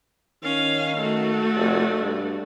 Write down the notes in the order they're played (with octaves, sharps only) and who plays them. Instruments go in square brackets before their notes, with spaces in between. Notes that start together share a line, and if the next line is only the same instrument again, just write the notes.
[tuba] D#3 [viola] C#4 F5
[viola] A3 F#4
[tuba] F1
G2